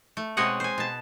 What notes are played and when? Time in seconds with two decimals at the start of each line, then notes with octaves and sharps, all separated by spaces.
0.17 A3
0.37 B2 G#3 C4 C#5 D#5 F#5
0.60 C5 G#5
0.78 B2 A5